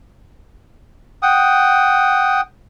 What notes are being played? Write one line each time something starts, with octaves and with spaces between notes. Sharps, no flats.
F#5 G5 D#6